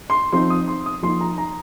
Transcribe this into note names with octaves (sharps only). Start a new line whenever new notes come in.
C6
F3 C4 D#4 C6
D#6
C6
D#6
F3 A#3 D#4 C6
A#5
A#5